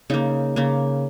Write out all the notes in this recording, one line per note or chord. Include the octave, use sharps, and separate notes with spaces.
C#3 A#3 D#4
C#3 A#3